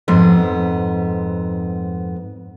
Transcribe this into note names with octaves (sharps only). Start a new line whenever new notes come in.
F2 G#2 B3